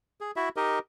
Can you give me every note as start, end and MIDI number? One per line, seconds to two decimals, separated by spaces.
0.21 0.31 68
0.36 0.49 64
0.36 0.49 66
0.36 0.49 76
0.57 0.79 63
0.57 0.79 67
0.57 0.79 70
0.57 0.79 75